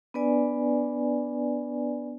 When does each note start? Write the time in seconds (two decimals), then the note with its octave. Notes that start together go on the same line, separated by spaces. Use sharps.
0.14 B3 D4 B4 D5 G#5